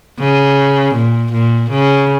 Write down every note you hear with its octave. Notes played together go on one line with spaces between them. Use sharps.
C#3
A#2
A#2
C#3